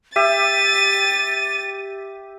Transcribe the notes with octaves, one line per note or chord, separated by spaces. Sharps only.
G4 E5 A6 D#7